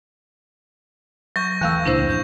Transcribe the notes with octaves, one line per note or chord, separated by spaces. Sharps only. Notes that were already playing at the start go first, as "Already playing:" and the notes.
F#3 C#6 G6 A#6
D#2 E3 A3 F5 E6
C#2 A#2 D4 E4 C5
F2 G6